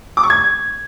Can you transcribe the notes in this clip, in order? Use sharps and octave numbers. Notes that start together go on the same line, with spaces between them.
D6
C#6
G#6